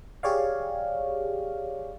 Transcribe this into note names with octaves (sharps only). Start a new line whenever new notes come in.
G4 G#4 C#5 D5 F5